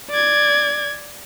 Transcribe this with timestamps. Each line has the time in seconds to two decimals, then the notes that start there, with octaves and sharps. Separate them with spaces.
0.10 D5 G#6